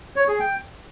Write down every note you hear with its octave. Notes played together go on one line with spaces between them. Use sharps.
C#5
G#4
G5